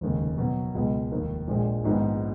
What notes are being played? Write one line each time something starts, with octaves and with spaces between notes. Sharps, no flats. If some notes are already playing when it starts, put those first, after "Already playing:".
F1 D#2 C#3 G#3
B2 F#3 B3
C#2 B2 G#3
F1 D#2 D#3
A#1 A#2 G#3
A#1 G#2 D#3 G#3 B3